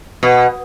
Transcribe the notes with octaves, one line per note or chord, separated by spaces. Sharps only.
B2